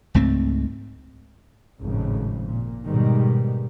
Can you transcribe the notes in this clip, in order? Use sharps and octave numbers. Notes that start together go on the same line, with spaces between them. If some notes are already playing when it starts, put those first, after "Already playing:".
C#2 G#2 A3 C4
G#1 F2 A2 C#3
A#2
G#2 B2 D#3 G3